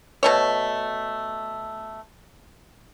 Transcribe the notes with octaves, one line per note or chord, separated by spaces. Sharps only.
B2 A3 C#5